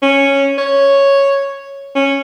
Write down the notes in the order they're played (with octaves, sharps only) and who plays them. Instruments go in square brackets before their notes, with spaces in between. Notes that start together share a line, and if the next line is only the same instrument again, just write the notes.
[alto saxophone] C#4
C#5
C#4